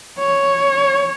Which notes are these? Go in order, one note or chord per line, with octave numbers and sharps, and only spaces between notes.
C#5